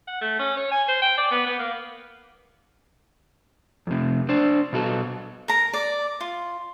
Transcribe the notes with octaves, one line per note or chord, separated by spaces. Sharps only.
F#5
A3
C#4
C#5
G#5
C5
G5
D5
B3
B3
A#3
F2 C3
D4 C5
B2 F#4 A4
A#4 A#5
D5
F4